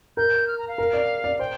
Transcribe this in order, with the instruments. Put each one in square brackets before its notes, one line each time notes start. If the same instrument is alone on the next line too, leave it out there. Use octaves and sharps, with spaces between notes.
[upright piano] A#4 [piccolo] G6
[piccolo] F6
A#5
F5
[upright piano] A#4
D5
D5
[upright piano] C5 [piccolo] G5